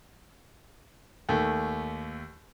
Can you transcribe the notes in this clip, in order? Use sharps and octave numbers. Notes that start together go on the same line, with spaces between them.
D#2 A3